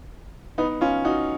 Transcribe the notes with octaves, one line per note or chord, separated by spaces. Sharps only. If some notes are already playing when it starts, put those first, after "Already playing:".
B3 D#4
C#4 F4
D#4 F#4